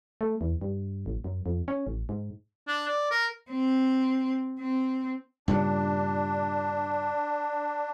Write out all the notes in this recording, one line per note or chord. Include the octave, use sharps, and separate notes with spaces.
A3
E2
G2
A1
F#2
F2
C#4
A1
G#2
D4
D5
A#4
C4
C4
G2 A#2 C#3 D4